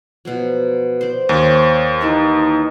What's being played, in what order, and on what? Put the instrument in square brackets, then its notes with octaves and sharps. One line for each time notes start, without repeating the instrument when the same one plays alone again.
[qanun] B2 F3 F#3
C5 D5
[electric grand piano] D#2 [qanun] C5 G5 [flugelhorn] C#5
[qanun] E3 B4 E5 [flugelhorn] D#4